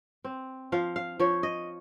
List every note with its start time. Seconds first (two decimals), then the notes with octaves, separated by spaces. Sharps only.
0.24 C4
0.72 F3 F5
0.96 F5
1.20 F3 C#5
1.43 D#5